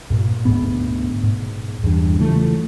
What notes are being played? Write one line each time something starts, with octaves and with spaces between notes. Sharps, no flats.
G2 A#2
D2 G#2 B2 B3
G#2 B2
E2 G2
C#3 E3 F3 A3